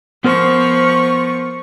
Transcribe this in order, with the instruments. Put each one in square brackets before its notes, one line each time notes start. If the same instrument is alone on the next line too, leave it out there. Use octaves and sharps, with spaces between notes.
[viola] F3 C#6 [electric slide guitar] B3 A#4 C5